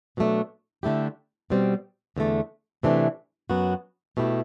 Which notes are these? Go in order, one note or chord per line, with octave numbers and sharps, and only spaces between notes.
B2 F#3 A3 D4
D3 A3 E4 G4
B2 G3 C4
E2 D3 A3
C3 E3 A3 D4
F#2 F#3 B3 F#4
B2 A3 E4 G4